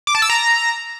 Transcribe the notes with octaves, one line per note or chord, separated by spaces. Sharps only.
D6
A5
E6
A#5